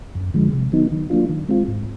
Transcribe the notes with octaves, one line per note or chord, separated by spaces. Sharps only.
F#2
D3 F3 G#3
C3
D#3 F#3 B3 D#4
D#3
F#3 A#3 D4 F4
D#3
G#3 C4 F4
G#2